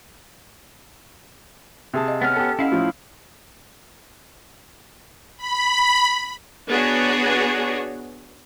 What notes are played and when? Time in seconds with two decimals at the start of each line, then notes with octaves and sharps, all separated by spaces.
1.94 C3 G#4 A5
2.08 D#5 F5
2.21 B3 C#4 F6
2.36 G4 A4
2.59 C#4 E4 D#5 F5 F#5
2.72 A2 F3 C#4
5.37 B5
6.68 B3 D4 F#4 G#4 C#5